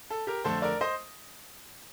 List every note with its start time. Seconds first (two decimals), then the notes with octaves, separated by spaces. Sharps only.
0.10 A4
0.27 G4 A#4
0.44 F2 D3 A3 A4 C5
0.62 A#4 D5
0.81 C5 D#5